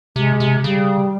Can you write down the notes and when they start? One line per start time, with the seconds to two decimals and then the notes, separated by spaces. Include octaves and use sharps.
0.16 C3 G#3
0.40 C3
0.64 C#3 G3